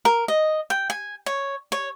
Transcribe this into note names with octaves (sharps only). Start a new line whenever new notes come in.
A#4
D#5
G5
G#5
C#5
C#5